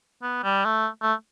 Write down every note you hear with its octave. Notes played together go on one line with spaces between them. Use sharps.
B3
G3
A3
A3